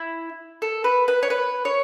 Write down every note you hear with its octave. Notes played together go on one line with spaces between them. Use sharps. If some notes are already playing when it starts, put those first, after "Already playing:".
Already playing: E4
A4
B4
B4
C#5
B4
C#5